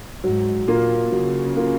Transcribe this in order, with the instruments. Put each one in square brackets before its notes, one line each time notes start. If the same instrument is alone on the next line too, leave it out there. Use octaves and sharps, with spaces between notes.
[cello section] G#2 [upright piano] F#3
[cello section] A#2 [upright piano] A#3 F4
[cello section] C#3 [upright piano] F#3
[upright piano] A#3 F4